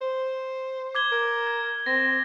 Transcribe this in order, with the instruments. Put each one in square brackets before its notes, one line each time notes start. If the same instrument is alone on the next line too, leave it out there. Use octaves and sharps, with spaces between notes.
[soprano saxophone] C5
[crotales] D6 G#6 G7
[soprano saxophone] A#4
[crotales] G#6
[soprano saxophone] C4 [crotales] A#6